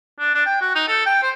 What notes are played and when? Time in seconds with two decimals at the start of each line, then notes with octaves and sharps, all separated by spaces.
0.19 D4
0.34 D4
0.46 G5
0.61 F#4
0.75 D#4
0.87 A4
1.06 G5
1.22 C5